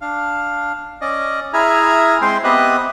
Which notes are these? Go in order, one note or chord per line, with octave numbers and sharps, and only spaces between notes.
D4 F5
C#4 D5 D#5
E4 G#4 E5 G#5 A#5 F6
G#3 C4 C5 G5 C6
B3 C4 G4 D#5 E5 F#6